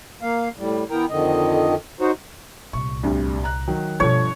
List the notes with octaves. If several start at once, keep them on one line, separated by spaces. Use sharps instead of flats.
A#3 F5
A2 G3
E3 B3 E4 A#4 G5 A#5
F2 D3 D#3 D#5
D#4 F#4 C5 C#5
C2 A#2 C#6
D2 G2 C3
A#5 F#6
D#3 F#3
G1 B2 F3 A#3 A4 C#5